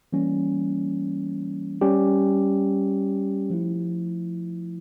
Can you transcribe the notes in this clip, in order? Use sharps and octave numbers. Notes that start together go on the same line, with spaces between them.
E3 G3 A#3 C#4
G3 C#4 G4
F3 A3 E4